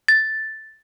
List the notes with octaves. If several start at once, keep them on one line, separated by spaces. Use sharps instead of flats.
A6